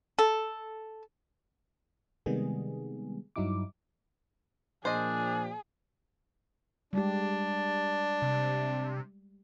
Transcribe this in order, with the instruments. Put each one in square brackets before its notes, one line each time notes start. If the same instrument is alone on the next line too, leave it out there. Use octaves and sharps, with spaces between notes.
[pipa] A4
[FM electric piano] C3 D#3 G3 G#3 B3 G#4
G2 F#3 D#4 E4 D6
[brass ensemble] A#2 F3 [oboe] D4 [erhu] G#4 [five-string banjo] C5 D#5
[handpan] G3 G#3 G4 [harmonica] D4
[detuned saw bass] C3